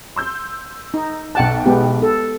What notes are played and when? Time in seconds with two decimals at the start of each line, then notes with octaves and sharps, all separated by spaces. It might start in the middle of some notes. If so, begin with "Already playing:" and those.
0.16 C6 E6 G6
0.94 D#4
1.35 B1 F#5 G5 A5 F#6
1.66 G#3 B3 G4
2.02 A4